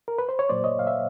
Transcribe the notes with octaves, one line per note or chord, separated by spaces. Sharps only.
A#4
B4
C5
C#5
A#2 F#3 A#3 C5 D5
C#5 D#5
F5
E5